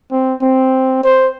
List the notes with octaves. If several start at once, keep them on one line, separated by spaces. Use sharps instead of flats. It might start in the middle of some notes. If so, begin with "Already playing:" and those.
C4
C4
C5